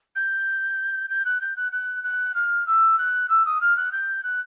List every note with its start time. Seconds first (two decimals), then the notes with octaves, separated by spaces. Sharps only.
0.15 G6
1.09 G6
1.25 F#6
1.41 G6
1.56 F#6
1.72 F#6
2.03 F#6
2.34 F6
2.66 E6
2.98 F#6
3.29 E6
3.45 D#6
3.61 F6
3.76 F#6
3.92 G6
4.23 F#6